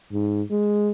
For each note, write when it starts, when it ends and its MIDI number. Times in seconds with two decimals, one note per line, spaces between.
0.12 0.42 44
0.51 0.92 56